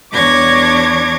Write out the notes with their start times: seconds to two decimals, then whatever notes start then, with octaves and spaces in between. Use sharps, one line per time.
0.12 E2 D4 C#5 D6 G#6 A#6